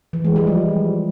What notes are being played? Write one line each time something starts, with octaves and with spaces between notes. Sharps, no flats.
E3
G#3
G3
F3